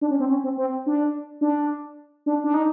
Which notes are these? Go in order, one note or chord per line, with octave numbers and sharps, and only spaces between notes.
D4
C#4
C4
C#4
C4
C4
D4
D4
D4
D4
D#4